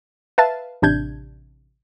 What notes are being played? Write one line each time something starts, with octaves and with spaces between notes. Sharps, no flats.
B4 E5 F5 A5 A6
A1 C3 D4 G6 G#6